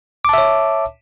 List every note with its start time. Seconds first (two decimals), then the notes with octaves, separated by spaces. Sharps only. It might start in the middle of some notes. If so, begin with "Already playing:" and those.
0.25 D6
0.29 A5
0.34 E5
0.38 C#5